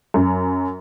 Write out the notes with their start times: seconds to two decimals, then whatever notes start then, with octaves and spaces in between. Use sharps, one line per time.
0.14 F#2